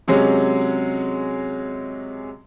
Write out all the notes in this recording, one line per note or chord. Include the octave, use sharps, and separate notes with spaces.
C3 F#3 G#3 C#4